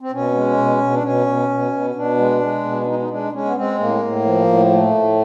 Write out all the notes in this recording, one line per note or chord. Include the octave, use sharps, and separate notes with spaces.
C4
B2 C#4
G#3
B2
B2
D4
B2 C#4
B2
B2
B2
B2 D4
G#3
G#3
B2
D4
G#3 D#4
D#4
G#3 D4
G#3 C#4
B3
G#3 C4
A2 A#3
A2
F3
A2
A3
A2